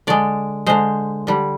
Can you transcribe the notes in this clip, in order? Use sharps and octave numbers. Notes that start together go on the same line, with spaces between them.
D3 G#3 D5
D3 G#3 C5
D3 G3